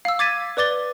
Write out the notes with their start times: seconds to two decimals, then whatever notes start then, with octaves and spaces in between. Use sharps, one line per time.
0.05 F5 E6
0.19 D6 G#6 A6 B6 D#7
0.57 B4 D5 D6 A6 G7